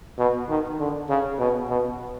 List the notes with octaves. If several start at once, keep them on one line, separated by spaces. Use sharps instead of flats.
B2
D#3
D3
C#3
B2
B2